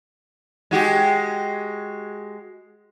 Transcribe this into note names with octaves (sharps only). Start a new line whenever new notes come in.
G#3 F#4 G4